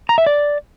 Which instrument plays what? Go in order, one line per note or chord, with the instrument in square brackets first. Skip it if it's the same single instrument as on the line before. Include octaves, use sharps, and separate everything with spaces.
[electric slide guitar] A#5
E5
D5